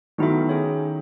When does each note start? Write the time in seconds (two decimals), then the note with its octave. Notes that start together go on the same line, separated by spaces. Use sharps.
0.18 D#3 F#3 B3 E4 A4 E5
0.49 C#4 G#4 C#5